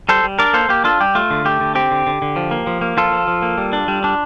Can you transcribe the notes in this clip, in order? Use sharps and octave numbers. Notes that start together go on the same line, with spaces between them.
G3 A4 C5
G3
D4 A#4 D5
A#3 A4 C5
A#3 G4
D4 F4 A4
G3 G4
A3 F4
D3
A3 G4
D3
C4 G4
D3
D3
D3
F3
A#3
F3
A#3
F3 F4 A4
F3
F3
A#3
G3
D4
G3
D4